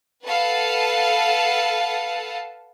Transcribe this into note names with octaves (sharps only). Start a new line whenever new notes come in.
A4 B4 F5 F#5 A5